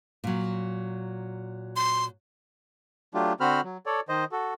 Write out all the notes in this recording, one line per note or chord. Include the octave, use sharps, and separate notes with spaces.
A#2 F#3
C6
F#3 A3 D4 F4 G4
D3 C4 F#4 C5 B5 F6
F#3
A4 C#5 D5
D#3 C5 D#5
F#4 A4